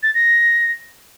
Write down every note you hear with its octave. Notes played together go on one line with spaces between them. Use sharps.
A6
A#6